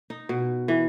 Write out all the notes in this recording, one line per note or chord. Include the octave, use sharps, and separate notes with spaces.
D#4
B2
E3